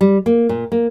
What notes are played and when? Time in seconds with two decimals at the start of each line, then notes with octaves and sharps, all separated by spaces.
0.01 G3
0.26 A#3
0.49 A#2
0.72 A#3